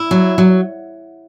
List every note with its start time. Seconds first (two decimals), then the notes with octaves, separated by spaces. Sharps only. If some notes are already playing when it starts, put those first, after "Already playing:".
Already playing: E4
0.11 F#3
0.38 F#3